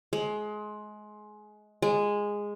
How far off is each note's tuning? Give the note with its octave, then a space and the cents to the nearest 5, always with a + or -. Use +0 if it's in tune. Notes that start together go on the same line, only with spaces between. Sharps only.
G#3 +25
G#3 -10